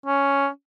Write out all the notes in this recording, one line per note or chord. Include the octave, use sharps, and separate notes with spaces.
C#4